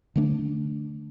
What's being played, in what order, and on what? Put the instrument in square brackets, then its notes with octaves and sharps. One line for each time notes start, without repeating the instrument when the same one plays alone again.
[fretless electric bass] D3 A3 D4